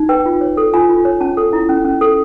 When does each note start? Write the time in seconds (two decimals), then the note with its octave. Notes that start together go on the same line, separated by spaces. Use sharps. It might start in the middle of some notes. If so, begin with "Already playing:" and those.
Already playing: D#4
0.09 B4 G5
0.26 F4
0.41 C#5
0.57 A4
0.74 F4 G#5
0.89 F4
1.05 C#5
1.21 C#4 A5
1.37 A4
1.53 E4
1.69 C#4
1.85 C#4
2.01 A4